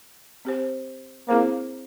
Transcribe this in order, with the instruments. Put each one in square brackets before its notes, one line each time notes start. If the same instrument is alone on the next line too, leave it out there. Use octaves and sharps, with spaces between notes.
[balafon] C4 G4 C5
[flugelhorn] A#3 [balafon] C4 E4 G#4 C5